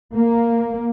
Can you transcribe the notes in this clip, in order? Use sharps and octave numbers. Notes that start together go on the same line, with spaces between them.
A#3